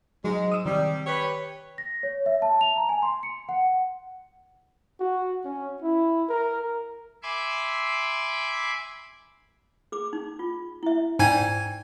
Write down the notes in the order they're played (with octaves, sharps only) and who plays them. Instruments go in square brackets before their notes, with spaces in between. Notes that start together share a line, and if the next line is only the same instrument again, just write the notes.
[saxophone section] G#2 G#3 [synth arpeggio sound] F#3
[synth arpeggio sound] D#6 E6
[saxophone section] C3 G3 [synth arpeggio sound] D#3
[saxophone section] G4 B4 C#5
[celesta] A#6
C#5
E5
A5
F7
A#5
G#5
C6
C#7
F#5
[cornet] F#4
C#4
E4
A#4
[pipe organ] E5 G#5 B5 C6 D6 E6
[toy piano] G#4 D6
D#4
F4
E4 E5
[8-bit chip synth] G#2 G#5 G#6 [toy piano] D#4 D5 G5